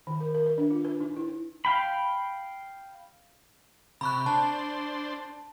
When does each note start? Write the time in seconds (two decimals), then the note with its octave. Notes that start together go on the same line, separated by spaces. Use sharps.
0.07 D#3
0.20 A#4
0.35 A#4
0.46 B4
0.58 D4
0.71 F4
0.85 B4
1.00 D#4
1.16 E4
1.65 F5 G5 B5
4.01 C3 B5 C#6 F#6
4.26 D4 C5 A5